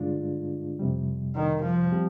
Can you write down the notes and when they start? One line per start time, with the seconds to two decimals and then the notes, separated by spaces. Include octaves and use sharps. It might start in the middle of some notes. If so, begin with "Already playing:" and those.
Already playing: G2 D3 G#3 D4 F4
0.79 F2 C3 G3
1.36 D#3
1.64 F3
1.92 G3 C4 G4